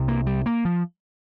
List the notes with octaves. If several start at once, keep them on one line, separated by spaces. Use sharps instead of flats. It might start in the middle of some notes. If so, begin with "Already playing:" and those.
Already playing: C2 C3
A#3
G3
A#3
F3